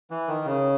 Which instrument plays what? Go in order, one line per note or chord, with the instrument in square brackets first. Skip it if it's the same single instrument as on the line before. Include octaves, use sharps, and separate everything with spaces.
[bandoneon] E3
D#3
C#3